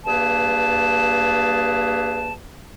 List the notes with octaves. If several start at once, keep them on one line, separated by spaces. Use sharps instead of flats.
G2 A#3 G#4 B4 A5